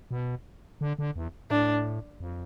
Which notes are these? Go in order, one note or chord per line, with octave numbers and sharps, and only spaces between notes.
B2
D3
D3
E2
A2 D4
F2